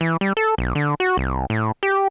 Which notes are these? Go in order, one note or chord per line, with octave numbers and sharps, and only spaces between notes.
E3
G3
A4
B1
D3
F#4
C2
A2
G4